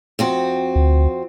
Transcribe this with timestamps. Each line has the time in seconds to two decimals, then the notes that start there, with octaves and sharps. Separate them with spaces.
0.19 F2 C4 F#4
0.76 D2